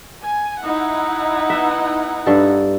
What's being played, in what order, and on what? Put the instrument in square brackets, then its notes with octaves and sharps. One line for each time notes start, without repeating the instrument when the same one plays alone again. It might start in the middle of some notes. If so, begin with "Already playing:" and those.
[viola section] G#5
D#4 E4 F#5
[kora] B3 E5
G2 A4